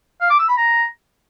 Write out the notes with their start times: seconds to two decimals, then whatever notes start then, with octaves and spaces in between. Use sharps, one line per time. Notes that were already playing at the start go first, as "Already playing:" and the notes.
0.21 F5
0.30 D6
0.39 E6
0.48 B5
0.58 A#5